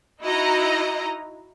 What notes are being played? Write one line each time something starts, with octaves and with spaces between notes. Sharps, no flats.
D#4 E4 F#4 D#5 A#5